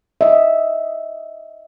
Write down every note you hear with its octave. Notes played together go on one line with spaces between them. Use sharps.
D#5 E5